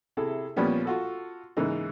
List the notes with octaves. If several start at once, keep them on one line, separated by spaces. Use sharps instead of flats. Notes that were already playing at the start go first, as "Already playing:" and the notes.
C3 E4 G#4 A4
A#2 F3 G3 B3 C#4
F4 F#4 A4
G#2 C#3 E3 A#3 D#4